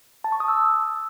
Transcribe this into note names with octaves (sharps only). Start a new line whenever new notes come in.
A5
C#6
D#6
E6